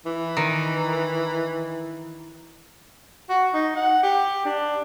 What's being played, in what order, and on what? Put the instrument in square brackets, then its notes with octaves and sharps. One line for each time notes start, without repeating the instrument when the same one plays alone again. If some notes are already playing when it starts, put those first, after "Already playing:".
[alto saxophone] E3
[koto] D#3
[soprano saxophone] F#4
D#4
F#5
G4
D4